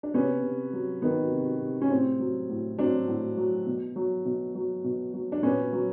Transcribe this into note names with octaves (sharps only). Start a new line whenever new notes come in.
D4
C3 B3 C#4
C3
F#3
D#3 B3
C3
C3
C#4
A2 C4
F#3
A2
F#3 C4 D4
A2
F#3
B2
F#3
B2
F#3
B2
F#3
D4
A#2 B3 C#4
F#3